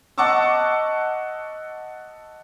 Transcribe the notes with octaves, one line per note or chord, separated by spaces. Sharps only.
D#5 F#5 A5 C#6 D6 E6